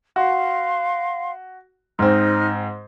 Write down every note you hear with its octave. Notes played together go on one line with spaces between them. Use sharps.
F#4 F5 C6
G#2 C4 D#4 F6